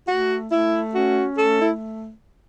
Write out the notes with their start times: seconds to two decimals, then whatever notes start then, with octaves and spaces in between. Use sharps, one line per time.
0.08 A3 F#4
0.51 A3 E4
0.93 C#4 F#4
1.36 A3 A4
1.61 E4